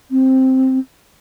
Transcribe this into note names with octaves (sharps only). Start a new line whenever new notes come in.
C4